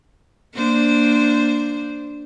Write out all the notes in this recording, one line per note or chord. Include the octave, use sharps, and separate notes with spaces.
A#3 D4 C5